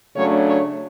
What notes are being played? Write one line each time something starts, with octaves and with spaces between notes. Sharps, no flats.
C#3 F#3 A3 D4 C#5
C#5